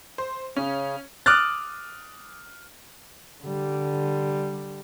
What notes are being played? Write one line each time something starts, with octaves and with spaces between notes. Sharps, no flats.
C5
C#3 C#4
D6 D#6 F6 F#6 A6
D3 G3